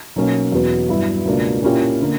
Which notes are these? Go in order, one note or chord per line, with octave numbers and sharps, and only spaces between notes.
B1 B2 A#3 C#4
E2 B2 F#3 B3
G2 F#3 B3 E4
C#2 B2 A#3 D4
A#2 A#3 C#4 E4 G4
D3 A#3